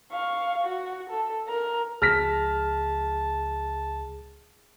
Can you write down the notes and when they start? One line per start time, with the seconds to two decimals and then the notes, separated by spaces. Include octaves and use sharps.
0.12 F5 C#6
0.64 F#4
1.10 A4
1.48 A#4 A#5
2.02 C#2 F3 G#4 A5 F6 A#6 B6